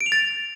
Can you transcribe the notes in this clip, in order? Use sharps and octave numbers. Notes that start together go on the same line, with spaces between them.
D7
F7
A6